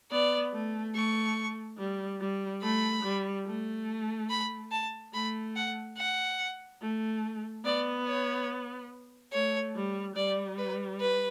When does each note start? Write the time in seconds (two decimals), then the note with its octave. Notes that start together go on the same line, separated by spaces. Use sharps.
0.11 B3 D5
0.53 A3
0.95 A3 C#6
1.78 G3
2.20 G3
2.63 A3 B5
3.04 G3
3.46 A3
4.30 B5
4.72 A5
5.13 A3 B5
5.56 F#5
5.97 F#5
6.81 A3
7.65 B3 D5
8.07 C#5
9.32 A3 C#5
9.75 G3
10.16 G3 D5
10.58 B4
11.00 B4